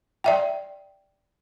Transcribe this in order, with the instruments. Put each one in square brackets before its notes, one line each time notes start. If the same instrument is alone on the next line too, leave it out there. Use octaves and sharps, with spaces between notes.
[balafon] D5 E5 G5